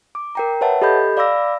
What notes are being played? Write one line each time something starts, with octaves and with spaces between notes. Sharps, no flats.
D6
A#4 G5 A#5
B4 C#5 E5 F#5 A5
G4 A4 D#5 B5 G6
D5 F5 B5 D6 E6 A#6